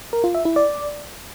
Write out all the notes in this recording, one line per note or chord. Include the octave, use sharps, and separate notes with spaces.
A#4
F4
E5
E4
D5